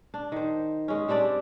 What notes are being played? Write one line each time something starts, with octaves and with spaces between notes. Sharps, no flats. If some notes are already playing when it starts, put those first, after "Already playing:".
D4
D#3 C5
G#3 C#4
G3 C4 D4 D5